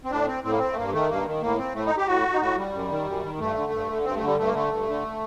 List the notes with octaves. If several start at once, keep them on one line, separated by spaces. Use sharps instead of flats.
C4
A2 D4
C4
A2 C4
A#3
C4
A3
G2 A#3
D#3 A3
G2 A#3
D#3
A2 A#3
C4
A2 A3
D#4
G4
A2 F#4
D#4
A2 F#4
G3
F#2
D#3
F#2
D#3
G2 A3
D3
G2
D3
G2 C4
A3
D3
G3
G2 A3
A#3
D3 A3
G2
D3